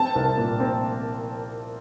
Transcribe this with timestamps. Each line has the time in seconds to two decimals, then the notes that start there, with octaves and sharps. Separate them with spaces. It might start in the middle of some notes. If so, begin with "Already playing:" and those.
Already playing: C4 A5
0.15 C2
0.37 A#2
0.60 C4